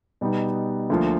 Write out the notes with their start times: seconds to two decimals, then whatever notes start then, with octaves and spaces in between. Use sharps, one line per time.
0.21 B2 G3 B3 D#4
0.90 D2 D3 F3 A#3